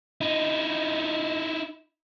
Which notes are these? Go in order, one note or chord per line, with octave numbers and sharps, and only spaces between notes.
D#4 E4